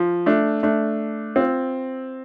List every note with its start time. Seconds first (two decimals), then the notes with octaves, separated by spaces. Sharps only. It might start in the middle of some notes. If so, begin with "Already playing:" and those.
Already playing: F3
0.26 A3 D4
0.63 A3 D4
1.36 C4 F4